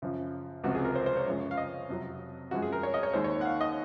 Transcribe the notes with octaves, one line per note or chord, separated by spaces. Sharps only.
F#2 C#3 F3
C#2 C3 F3 F#4
G#4
A#4
C5
C5
C#5
F#2 C#3 F3 G#3
F5
D#5
F2 C3 F#3
F#2 F3 G#3 F#4
G#4
A#4
C#5
D#5
C#5
D#2 D#3 G#3 C5
C#5
F#5
F5
D#5